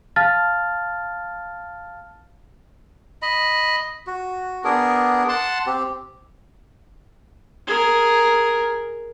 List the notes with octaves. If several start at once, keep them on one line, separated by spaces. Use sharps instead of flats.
F5 A5 F6 A6
D#5 B5
F#4
B3 D4 G#4 A#4
F#5 A5 C6
C4 G4
G#4 A#4